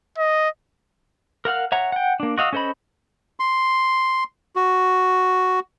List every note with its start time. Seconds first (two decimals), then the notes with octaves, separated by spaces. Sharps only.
0.18 D#5
1.45 A#4 F5 F#5 F6
1.72 C#5 E5 F#5 A#5
1.92 F#5 G5
2.20 A#3 D4
2.38 F#4 D#5 F5 E6
2.53 C#4 A4 C5 D#5 B5
3.39 C6
4.56 F#4